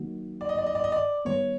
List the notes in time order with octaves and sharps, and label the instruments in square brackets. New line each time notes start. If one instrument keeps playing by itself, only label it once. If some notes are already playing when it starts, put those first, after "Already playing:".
Already playing: [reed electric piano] D#3 F#3 A#3 D#4 F#4
[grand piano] D5
D#5
D5
D#5
D5
D#5
D5
[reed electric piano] D#3 G3 B3 [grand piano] C#5